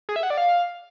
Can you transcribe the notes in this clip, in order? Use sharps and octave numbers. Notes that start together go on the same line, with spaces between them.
G#4
E5
F#5
D5
F5